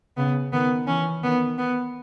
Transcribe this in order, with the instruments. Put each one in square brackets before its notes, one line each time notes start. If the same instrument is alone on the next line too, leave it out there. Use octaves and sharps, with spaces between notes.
[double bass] C#3 [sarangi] B3
[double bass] D#3 [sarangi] B3
[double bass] E3 [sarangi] C#4
[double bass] D#3 [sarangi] B3
[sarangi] B3